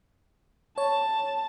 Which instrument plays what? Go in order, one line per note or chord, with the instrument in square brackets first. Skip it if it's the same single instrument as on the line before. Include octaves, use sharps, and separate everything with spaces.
[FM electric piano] C#5 [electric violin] A5